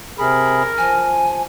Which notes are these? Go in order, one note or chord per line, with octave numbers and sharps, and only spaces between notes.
C3 G#4 A#4 B5
F3 G#5